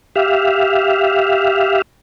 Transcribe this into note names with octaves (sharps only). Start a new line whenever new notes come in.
G4 E5 F5